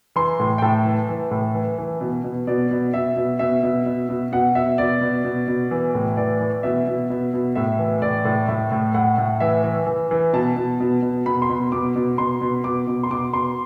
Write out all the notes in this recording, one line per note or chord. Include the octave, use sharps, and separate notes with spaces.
E3 C6
A2
G5
A2 A5
E3
E3
A2
E3
E3
B2
B2
B2 D5
B2
B2 E5
B2
B2 E5
B2
B2
B2
B2 F#5
B2 E5
B2 D5
B2
B2
B2
E3
A2
E3 D5
E3
B2 E5
B2
B2
B2
A2 E5
E3
A2 D5
A2
A2 E5
A2
A2 F#5
A2
E3 E5
E3
E3
E3
B2 A5
B2
B2
B2
B2 B5
C6
B2
B2 D6
B2
B2 C6
B2
B2 D6
B2
C6
B2 D6
B2 C6